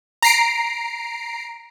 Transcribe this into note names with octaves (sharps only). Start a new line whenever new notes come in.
A#5 C7 D7